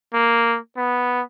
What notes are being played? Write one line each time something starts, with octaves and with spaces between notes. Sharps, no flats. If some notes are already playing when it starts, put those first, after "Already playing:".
A#3
B3